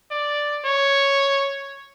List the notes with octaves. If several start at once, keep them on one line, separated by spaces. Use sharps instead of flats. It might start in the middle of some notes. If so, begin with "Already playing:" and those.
D5
C#5